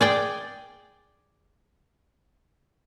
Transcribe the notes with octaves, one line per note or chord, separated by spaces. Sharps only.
G#4 D5 G5